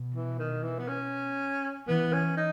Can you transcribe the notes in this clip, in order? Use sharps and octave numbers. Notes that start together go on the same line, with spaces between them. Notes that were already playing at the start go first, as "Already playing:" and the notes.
Already playing: B2
E3
D#3
E3
B3
C#4
E3 B3
C#4
D#4